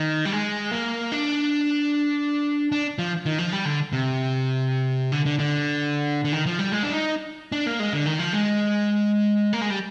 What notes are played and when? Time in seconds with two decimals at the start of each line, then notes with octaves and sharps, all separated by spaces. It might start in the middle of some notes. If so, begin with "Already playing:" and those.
Already playing: D#3
0.25 G3
0.32 G#3
0.71 A#3
1.12 D4
2.72 D4
2.99 F3
3.26 D#3
3.38 F3
3.52 G3
3.65 D3
3.93 C3
5.12 D3
5.26 D3
5.39 D3
6.25 D3
6.32 D#3
6.46 F3
6.59 G3
6.72 G#3
6.83 D4
6.93 D#4
7.52 D4
7.66 A#3
7.80 G#3
7.93 D3
8.06 D#3
8.19 F3
8.33 G#3
9.53 A#3
9.61 G#3
9.70 G3